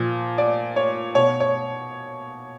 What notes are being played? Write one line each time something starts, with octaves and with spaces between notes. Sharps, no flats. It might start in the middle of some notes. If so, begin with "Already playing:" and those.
Already playing: A#2 F3
D5
C#5
B2 C#5
C#5